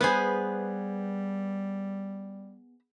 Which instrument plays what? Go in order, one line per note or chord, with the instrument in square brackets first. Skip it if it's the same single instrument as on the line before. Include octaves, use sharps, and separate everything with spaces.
[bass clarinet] G3 [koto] B3 G#4 [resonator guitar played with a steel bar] B4 C5